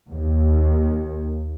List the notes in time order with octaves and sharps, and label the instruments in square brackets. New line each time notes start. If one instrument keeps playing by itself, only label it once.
[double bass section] D#2